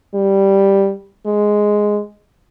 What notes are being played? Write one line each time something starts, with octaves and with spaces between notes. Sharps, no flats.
G3
G#3